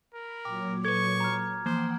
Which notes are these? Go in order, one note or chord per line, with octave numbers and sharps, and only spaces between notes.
A#4 B5
A#2 F#3 C#5 G5 D6
A4 B4 C#6 G#6
A#5 F6
E3 F3 A#3 C5 F#5 G5 C6